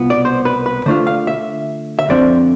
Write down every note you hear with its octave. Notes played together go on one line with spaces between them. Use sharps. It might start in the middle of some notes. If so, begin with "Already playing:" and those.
Already playing: C2 B2 B3 F4
D5
C5
B4
B4
D3 A3 D4 F4 C5
F5
E5
E5
F2 D3 F3 C4 D5